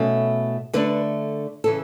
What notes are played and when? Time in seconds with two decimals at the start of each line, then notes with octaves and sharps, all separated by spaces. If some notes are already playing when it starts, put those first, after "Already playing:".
Already playing: B2 A3 C#4 E4
0.73 D3 A3 D4 B4
1.64 C#3 E3 A4